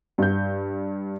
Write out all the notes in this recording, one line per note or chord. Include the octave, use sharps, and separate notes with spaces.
G2 G6